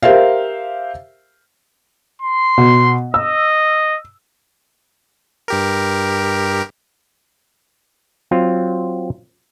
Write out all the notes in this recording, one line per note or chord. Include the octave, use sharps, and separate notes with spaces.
G4 A#4 C5 E5 F5
C6
B2
D#5 E6
G2 G4 A#4
F#3 C4 F4